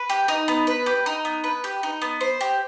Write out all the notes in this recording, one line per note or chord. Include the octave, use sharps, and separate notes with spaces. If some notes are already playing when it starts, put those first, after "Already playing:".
Already playing: B4
G4
D#4
B3
B4
G4
D#4
B3
B4
G4
D#4
B3
C5
G4